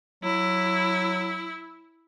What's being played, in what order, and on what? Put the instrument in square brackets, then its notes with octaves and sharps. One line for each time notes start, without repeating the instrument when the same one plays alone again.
[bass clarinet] F#3 [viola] E4